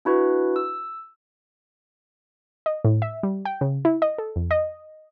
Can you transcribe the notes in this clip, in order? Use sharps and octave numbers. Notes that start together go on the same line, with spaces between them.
D4 E4 F#4 B4
E6
D#5
A2
E5
G3
G5
C#3
E4
D#5
A4
F2
D#5